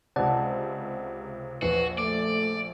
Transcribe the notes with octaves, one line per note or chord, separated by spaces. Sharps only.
C#2 C3 D5 F#5 A5
A#1 E2 F#4 B4 C7
A3 D5 D6